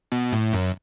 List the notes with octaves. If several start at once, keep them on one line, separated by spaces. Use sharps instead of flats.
B2
A2
F#2